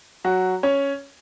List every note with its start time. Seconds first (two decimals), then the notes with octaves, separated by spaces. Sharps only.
0.24 F#3 F#4
0.63 C#4 C#5